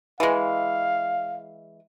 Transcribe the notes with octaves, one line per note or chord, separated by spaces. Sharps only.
E3 G#3 F5